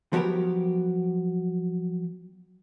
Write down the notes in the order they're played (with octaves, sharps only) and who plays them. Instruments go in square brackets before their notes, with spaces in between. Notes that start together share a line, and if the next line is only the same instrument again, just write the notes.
[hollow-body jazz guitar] F3 F#3 B3 G4 A#4